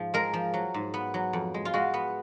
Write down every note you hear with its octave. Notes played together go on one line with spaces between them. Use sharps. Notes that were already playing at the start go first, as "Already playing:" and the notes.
Already playing: G#2 F3
G#3 A#4
F3
F#3
G#2
B3
F#3
F2
G#3
F4
G#3 F#4
B3